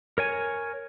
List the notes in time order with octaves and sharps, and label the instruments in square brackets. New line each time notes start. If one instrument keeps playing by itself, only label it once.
[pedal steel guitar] A#4 C#5 G#5